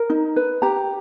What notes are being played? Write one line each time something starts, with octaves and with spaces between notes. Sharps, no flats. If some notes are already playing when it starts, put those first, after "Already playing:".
Already playing: A#4
D#4
B4
G4 A#5